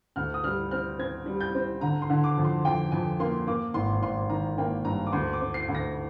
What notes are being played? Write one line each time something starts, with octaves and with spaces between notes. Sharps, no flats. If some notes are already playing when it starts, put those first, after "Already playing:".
D2 F6
D#6
G3 F6
C4 F6
C4 G#6
G3
G6
C4
D3 A#5
C6
D3
D6
F2
C6
F2 G5
F2 G#5
A#3 C6
A#3 D6
G#1 C6
G#1 C6
D#3 A#5
A#3 G5
G2 A#5
D6
D2 C6
D6
C4
C7
D2
A#6